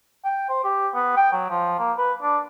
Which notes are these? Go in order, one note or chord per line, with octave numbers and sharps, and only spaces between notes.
G5
C5
G4
B3
G5
F#3
F3
A#3
B4
D4